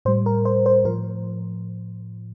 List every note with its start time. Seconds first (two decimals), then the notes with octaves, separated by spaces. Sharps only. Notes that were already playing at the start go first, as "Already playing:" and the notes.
0.05 A2 G3 C5
0.26 A#4
0.45 C5
0.66 C5
0.85 A2 F3 A#4